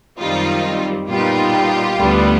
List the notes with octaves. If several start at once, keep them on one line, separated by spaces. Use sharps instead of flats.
F#2 D#3 G3 C4 D#4 F4
A#2 G3 B3 D#4 F4 G4
D2 D3 G3 B3